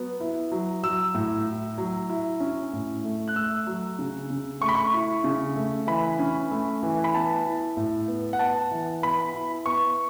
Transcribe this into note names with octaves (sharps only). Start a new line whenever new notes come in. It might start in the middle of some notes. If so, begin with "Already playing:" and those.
Already playing: F#3 B3
E4
F#3
F#3 E6
A2
E4
F#3
E4
C#4
A2
A3
F#6
A3 E6
F#3
C#3
C#3
A3 C#6
B5
C#6
E4
C#3
A3
E3 B5
C#4
A3
E3
B5
B3 A5
E4
A2
B3
F#5
B3 A5
E3
B3 B5
E4
B3 C#6